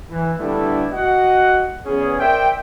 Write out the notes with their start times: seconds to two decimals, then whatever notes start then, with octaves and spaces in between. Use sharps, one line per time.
0.10 E3
0.40 D3 G3 A3 B3 D4 E4
0.92 F#4 D#5 F#5
1.85 E2 B3 C#4 G#4
2.20 A#4 C5 D5 E5 G5